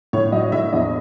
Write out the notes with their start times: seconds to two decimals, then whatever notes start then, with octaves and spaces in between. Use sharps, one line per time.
0.13 A2 C#5
0.32 F#3 D#5
0.52 A2 E5
0.73 E2 D#5